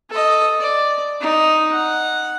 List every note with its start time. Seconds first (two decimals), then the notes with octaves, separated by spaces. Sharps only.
0.10 A4 D#5
0.60 D5
1.21 D#4
1.72 F#5